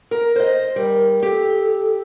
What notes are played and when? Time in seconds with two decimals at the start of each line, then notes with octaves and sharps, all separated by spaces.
0.11 A#4
0.36 C5 D#5
0.76 G3 A#4
1.23 G4 A4